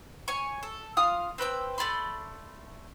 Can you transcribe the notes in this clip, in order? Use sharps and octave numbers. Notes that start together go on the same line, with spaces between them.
C#5 G#5 C#6
A4
F4 F5 D#6
C4 B4 G5 E6
A3 D5 B5 C6